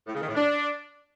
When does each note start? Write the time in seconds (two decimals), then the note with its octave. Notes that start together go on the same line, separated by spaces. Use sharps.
0.07 A2
0.14 C#3
0.21 D#3
0.28 A2
0.35 D4